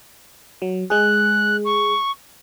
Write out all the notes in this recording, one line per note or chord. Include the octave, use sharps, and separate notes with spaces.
F#3
G#3 G#4 F#6
C#6